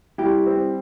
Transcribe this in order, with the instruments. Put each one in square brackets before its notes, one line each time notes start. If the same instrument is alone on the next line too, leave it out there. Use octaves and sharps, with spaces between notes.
[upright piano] G3 [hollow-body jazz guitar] E4 G4
[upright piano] C4